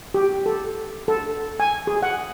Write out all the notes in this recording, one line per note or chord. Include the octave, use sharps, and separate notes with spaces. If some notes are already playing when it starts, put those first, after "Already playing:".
G4
A4
A4
G#5
G#4
F#5